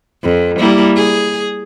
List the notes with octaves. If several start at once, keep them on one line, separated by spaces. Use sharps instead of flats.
F2
G3 A#3 E4
G#4